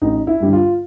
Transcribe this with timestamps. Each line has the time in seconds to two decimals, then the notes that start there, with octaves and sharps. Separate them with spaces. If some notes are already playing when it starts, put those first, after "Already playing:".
0.02 A1 D#4
0.27 E4
0.40 G2 D3 G3
0.53 F4